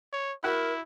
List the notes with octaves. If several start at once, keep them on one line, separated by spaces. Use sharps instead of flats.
C#5
E4 F#4 A#4 F#5 B5